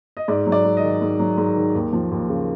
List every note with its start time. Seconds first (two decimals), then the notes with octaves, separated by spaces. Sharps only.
0.17 D#5
0.28 G#2 D5
0.46 F#3
0.52 D5
0.65 G#2
0.77 D#5
0.83 D#3
1.02 G#2
1.19 F#3
1.37 G#2
1.56 D#3
1.75 D#2
1.93 F3
2.12 D#2
2.29 C#3